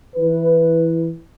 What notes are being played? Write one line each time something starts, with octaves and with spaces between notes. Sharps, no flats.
E3 B4